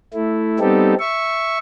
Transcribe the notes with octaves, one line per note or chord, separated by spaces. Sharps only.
A3 E4
G3 B3 C4 D#4 G4 A4
E5 C#6